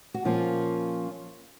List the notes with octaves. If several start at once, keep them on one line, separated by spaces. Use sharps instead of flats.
F#4
A#2 F3 A#3 C#4 F4